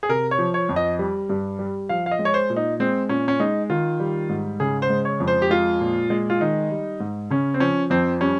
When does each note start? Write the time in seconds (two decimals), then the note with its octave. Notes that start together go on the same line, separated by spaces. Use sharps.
0.03 G#4
0.09 C3 A#4
0.31 C#5
0.39 F3
0.54 C#5
0.69 F2
0.76 D#5
0.99 G3
1.30 G2
1.59 G3
1.89 F3 F5
2.06 F5
2.11 D#5
2.19 G#3
2.25 C#5
2.34 C5
2.50 A#2
2.56 D#4
2.80 G#3 C4
3.09 A#2 C#4
3.28 C#4
3.40 G#3 D#4
3.70 D#3 F4
4.00 G3
4.29 G#2
4.60 C#3 G#4
4.82 C5
4.90 G#3
5.05 C#5
5.20 F2
5.28 C5
5.42 G4
5.50 G#3 F4
5.80 A#2
6.10 G#3
6.30 F4
6.40 D#3 D#4
6.70 G3
7.00 G#2
7.30 C#3 C#4
7.54 C4
7.60 F3 C#4
7.90 F2 C4
8.21 G3 C#4